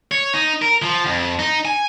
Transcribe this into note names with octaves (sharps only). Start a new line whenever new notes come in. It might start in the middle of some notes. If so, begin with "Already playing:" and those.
C#5
D#4
A#4
F3
F2
D#4
G#5